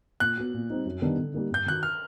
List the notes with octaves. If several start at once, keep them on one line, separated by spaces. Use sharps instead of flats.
A#2 F#6
F#3 B3
A#2
G3 C4 D#4
F#2
D#3 G3 B3 D4
D3
G3 A#3 D#4
G2 G6
D#3 F#3 F#6
F6